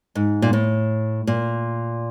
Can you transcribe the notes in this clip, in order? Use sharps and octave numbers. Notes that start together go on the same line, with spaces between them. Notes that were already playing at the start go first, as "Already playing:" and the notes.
G#2
A#2
A2
A#2